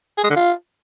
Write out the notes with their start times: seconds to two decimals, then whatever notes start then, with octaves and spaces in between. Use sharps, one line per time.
0.18 G#4
0.24 G#3
0.30 D3
0.36 F4